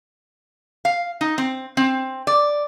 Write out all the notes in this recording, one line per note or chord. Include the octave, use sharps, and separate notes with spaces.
F5
D#4
C4
C4
D5